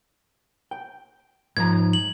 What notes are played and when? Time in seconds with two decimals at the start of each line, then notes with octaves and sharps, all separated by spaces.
0.71 G5
1.57 G#2 F3 A#5 G#6
1.93 F#7